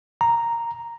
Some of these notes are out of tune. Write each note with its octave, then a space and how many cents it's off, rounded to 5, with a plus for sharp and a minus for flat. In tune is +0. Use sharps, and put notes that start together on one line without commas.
A#5 +0